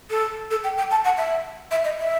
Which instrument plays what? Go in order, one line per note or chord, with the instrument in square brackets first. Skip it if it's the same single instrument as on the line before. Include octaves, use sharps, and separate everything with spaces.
[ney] A4
A4
G5
G5
A5
F#5
E5
E5
D#5
E5